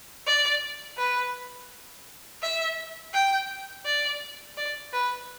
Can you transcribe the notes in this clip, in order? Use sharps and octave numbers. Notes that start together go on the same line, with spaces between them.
D5
B4
E5
G5
D5
D5
B4